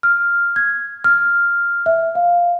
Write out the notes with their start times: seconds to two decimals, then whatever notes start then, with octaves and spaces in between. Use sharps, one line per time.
0.03 F6
0.56 G#6
1.04 F6
1.86 E5
2.15 F5